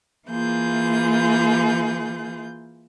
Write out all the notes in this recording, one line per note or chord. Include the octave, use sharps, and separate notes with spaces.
E3 A#3 F4 G#4 G6